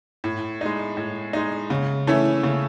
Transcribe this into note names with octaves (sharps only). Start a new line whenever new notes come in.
A2
G#3 D#4
A2
G#3 D#4
C#3
E3 A3 C#4 E4
C#3